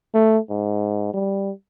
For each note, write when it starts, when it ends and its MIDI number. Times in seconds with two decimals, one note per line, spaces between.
0.14 0.38 57
0.50 1.09 44
1.14 1.51 55